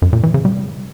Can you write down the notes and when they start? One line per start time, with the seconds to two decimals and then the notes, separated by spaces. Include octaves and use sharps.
0.02 F#2
0.13 A#2
0.23 E3
0.34 C#3
0.45 G3